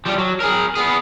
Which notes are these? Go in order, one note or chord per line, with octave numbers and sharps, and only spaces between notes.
F3 G3
F#3
G#4 A#4
B3 G#4